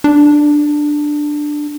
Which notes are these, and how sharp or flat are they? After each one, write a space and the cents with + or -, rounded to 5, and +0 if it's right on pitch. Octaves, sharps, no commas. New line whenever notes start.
D4 +10